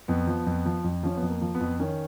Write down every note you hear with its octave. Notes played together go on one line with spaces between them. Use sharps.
F2 B3
F3
F2
F3
F2
F3 C#4
B3
F2
A#3
F3
B3
F2
D#3 C#4